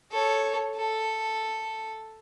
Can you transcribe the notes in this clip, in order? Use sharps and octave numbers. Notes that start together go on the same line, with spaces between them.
A4 C#5
A4